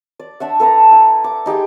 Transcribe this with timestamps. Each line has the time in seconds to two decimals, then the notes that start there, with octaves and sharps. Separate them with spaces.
0.19 D5
0.40 D4 E5 F#5
0.60 A4 B4 A5 A#5
0.91 E4
1.24 D6
1.46 D#4 G4 G#4 G5